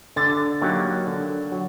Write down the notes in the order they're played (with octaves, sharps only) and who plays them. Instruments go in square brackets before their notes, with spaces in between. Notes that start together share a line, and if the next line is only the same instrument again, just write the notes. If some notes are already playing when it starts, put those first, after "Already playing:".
[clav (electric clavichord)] D3 [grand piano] A6
[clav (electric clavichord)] F#3 A#3 D#4 G4
D3
F#3